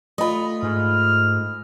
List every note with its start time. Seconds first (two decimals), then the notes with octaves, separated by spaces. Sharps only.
0.18 A3 F4 D#5 B5
0.63 G#2 F6